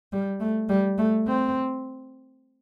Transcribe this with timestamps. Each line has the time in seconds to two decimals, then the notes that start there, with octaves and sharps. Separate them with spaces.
0.12 G3
0.40 A3
0.69 G3
0.98 A3
1.28 C4